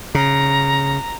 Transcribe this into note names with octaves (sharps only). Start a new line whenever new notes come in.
C#3 A#5